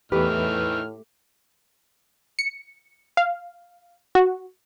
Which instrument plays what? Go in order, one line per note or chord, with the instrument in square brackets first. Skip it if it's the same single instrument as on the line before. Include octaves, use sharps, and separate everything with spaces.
[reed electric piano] E2 B4 [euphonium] A2 [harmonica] D#3 E3 F6 [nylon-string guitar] A3 G4
[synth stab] C#7
F5
F#4